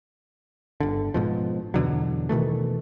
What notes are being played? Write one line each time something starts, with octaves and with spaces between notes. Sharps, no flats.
G1 D3
G#2 B2 F3
E2 B2 D3 F#3
B2 D#3 E3 A3